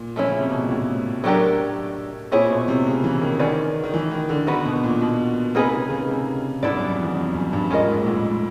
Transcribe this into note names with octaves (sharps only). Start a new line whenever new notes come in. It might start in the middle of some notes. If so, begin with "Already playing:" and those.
Already playing: A#2
F3 A3 C#4 E4
C#3
C3
B2
A#2
A2
F#3 A3 D4 G4 A#4
A#2 C4 E4 G#4 C#5
B2
C3
C#3
E3
D#3
D#3 C#4 F#4 B4 D5
D#3
E3
D#3
D3
D3 B3 D#4 F#4 B4
B2
A#2
B2
C3 A#3 D#4 G#4 B4
C#3
C#3
C3
G2 B3 E4 A4 D5
F#2
F2
E2
F2
F#2
G2
G#2 C#4 F4 A#4 D#5
G#2
A#2
A2